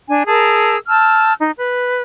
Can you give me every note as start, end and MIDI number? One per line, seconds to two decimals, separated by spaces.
0.09 0.23 62
0.09 0.23 80
0.27 0.76 68
0.27 0.76 70
0.27 0.76 81
0.27 0.76 88
0.89 1.33 81
0.89 1.33 88
0.89 1.33 89
0.89 1.33 91
1.39 1.51 63
1.58 2.01 71